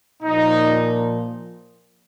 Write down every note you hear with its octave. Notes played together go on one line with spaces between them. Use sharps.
A#2 F3 D#4